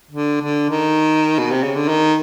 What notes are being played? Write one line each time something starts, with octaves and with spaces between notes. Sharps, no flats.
D3
D3
D#3
B2
C3
C#3
D3
D#3